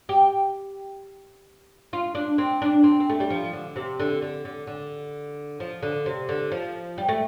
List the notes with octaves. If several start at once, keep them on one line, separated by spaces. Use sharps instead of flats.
G4
F4
D4
C4
D4
C4
C4
A3
G3
F3
D3
C3
D3
D3
D3
D3
F3
D3
C3
D3
F3
G3
A3